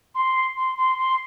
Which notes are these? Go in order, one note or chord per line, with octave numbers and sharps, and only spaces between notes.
C6
C6
C6
C6